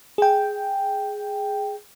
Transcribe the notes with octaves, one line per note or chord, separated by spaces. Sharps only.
G#4 G5